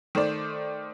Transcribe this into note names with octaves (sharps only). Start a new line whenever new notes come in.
D#3 A3 C5 D5